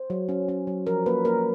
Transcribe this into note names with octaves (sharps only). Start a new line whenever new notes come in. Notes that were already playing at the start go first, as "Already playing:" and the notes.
Already playing: C5
F#3
C#4
C#4
F#3
F3 A#4
A#3 B4
A#3 A#4